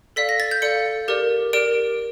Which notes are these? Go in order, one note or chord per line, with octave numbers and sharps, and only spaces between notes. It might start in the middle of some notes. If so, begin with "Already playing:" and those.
A4 D5 F5 B6
A#6
A6
G6
A4 D5 F5 C#7
G4 A#4 D5
G4 A#4 D5 D7